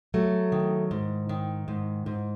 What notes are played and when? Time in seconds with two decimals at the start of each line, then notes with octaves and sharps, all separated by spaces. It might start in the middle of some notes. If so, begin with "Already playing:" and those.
0.14 F#3 A3
0.52 D#3
0.91 G#2
1.29 D#3
1.68 G#2
2.06 G#2